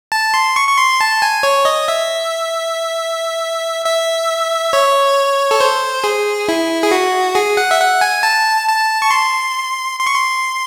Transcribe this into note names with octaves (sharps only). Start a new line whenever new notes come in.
A5
C6
C#6
C#6
C6
A5
G#5
C#5
D#5
E5
E5
C#5
A4
C5
G#4
E4
G#4
F#4
G#4
F#5
E5
F#5
G#5
A5
A5
C#6
C6
C6
C#6
C6